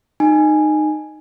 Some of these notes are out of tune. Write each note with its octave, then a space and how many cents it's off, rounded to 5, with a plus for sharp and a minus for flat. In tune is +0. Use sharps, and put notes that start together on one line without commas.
D#4 -20 G#5 +0